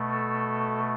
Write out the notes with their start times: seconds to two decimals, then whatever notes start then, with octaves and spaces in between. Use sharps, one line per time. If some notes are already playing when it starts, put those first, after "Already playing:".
Already playing: B2 A3
0.11 A4